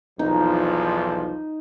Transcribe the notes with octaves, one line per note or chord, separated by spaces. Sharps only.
B1 E2 F3 D#4